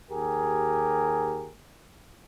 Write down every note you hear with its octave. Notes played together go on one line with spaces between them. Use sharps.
D#2 G4 G#4 A#4